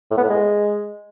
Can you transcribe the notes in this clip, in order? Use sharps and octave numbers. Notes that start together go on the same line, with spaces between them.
A2
B3
A2
G#3